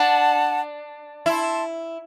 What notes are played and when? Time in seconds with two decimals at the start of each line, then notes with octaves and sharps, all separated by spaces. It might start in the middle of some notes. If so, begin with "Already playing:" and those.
Already playing: D4 F#5 A5
1.26 E4 A5 C6